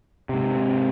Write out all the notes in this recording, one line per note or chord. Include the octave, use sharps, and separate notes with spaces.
G#2 C3